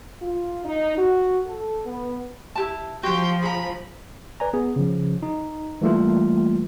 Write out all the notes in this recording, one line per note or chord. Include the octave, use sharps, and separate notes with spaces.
F4
D#4
F#4
A4
B3
E4 G4 A5
F3 F#4 G4 G5 C6
G#4 A#5 B5
B4 D5 G#5 A#5
B3 G#4
C#3 F3
D#4
E3 G3 A3 A#3 F4